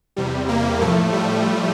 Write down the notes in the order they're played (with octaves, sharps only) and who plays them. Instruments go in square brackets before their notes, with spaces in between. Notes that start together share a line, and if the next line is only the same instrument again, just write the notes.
[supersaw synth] E2 C3 G3
A#3
A2 F3 A3
G3